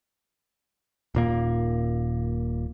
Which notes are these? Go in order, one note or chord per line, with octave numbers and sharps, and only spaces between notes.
D#1 A#2 A#3